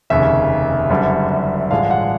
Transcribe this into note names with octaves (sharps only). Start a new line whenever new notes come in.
F1 D#2 C#3 E5
F#1 F#2 D3 G3
A1 G2 D3 F3 G#3 F5
F#5